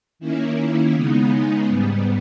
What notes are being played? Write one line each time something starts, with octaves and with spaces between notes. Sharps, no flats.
D#3 A#3 C#4 E4
C#3 G#3 B3 D#4
G#2 G3 B3